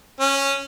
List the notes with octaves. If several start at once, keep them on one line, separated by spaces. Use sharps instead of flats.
C#4